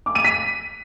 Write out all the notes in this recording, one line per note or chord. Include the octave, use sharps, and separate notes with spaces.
D6
D#7
B6